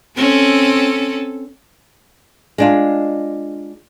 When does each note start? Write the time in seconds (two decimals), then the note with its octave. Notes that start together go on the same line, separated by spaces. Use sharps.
0.17 C4 C#4 A4
2.58 G#3 D4 F4